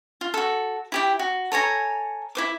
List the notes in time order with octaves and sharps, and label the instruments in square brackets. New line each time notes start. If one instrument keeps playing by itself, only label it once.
[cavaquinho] F4
F#4 A4
E4 G4 G5
F#4
A4 C#5 G#5 A#5
E4 C5 D6